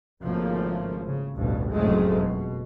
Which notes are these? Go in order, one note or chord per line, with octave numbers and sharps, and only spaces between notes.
G#1 C#3 F3 A3 A#3
C#3
A1 D2 G2 B2
F#1 F2 A2 F#3 G#3 A3
B2